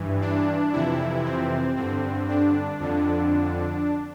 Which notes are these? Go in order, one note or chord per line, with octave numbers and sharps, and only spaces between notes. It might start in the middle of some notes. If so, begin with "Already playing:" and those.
Already playing: G2 E3
D4
F2 C3 E3 E4
C4
G2 D3 C4
D4
F2 D3